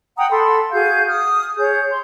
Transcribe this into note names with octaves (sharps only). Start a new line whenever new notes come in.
F#5 G5 A#5 D#6
A4 B5 C6
F#4 G#4 F5 G6
D#6 F6
G#4 C#5 G6
C6